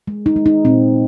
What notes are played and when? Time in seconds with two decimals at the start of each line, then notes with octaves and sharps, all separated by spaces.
0.08 G#3
0.26 D#4
0.36 G#3
0.46 D#4
0.65 A#2 C4